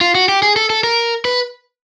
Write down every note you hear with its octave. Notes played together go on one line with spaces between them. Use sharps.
F4
F#4
G4
G#4
A4
A4
A#4
B4